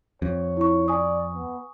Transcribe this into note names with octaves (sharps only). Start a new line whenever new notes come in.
F2 C#5
E4 C#6
D5 G#5 C#6 D#6
B3